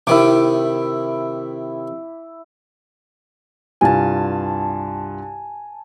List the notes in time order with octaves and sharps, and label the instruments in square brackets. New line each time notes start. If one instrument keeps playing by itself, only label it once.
[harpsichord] C3 D#3 [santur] E4 D6
[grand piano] C2 G2 F4 [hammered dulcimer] G#5 A5